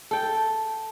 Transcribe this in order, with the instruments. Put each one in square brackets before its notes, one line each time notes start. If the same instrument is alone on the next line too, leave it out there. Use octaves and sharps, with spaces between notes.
[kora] A4 G5